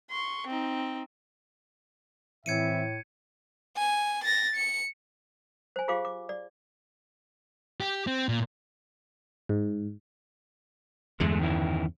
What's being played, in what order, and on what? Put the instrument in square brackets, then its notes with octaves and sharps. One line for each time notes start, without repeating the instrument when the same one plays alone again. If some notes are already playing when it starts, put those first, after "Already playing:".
[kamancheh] C6 C#6
C4 D#4
[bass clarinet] A2 [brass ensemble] E3 C4 E5 [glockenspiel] G#6 C#7 D#7
[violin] G#5
A6 A#6
C#7
[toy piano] C5 G#5
F4 G4 G#4 C5 F5 D6
D6
D5
[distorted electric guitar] G4
C4
A#2
[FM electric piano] G#2
[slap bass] E2 G2 D3 [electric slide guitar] G#3 A3
[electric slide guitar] D#3 C#4 E4